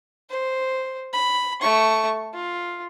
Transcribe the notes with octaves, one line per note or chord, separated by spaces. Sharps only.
C5
B5
A3 C#6
F4